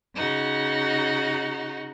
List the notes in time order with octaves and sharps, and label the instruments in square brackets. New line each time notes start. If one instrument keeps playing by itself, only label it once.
[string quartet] C#3 D#4 F#4